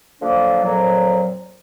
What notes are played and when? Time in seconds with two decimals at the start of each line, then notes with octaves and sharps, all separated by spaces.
0.20 D3 F3 F#3 A#3 D4
0.63 F2 A#2 F#3